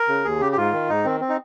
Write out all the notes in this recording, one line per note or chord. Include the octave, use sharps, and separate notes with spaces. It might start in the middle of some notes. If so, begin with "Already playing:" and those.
Already playing: A#4
C#3
D#2 G#4
C#3 G4
G4
G#2 F4
D#3
G#2 D#4
D#3 C4
C4
D#4